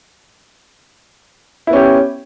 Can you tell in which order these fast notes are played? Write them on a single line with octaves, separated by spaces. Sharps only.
E4 B3 C#4 G4